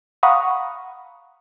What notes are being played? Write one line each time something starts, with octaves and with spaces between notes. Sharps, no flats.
F5 F#5 A#5 B5 C#6 D#6